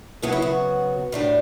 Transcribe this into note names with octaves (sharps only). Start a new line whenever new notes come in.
C#3 F#3 B3 E4 F#4
E4
F#4
A2 G3 D4